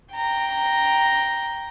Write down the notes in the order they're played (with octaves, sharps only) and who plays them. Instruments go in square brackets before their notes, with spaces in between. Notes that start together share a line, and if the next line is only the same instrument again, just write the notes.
[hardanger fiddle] G5 A#5